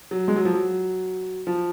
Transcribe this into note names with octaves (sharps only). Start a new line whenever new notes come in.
F#3
G#3
F#3
F3
F#3
F3